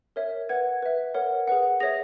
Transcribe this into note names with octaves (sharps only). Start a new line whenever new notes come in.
A#4 C#5 E5
B4 F#5 G#6
B4 E5
A#4 C#5 F#5
G#4 B4 F#5
G#4 C#5 E5 A#6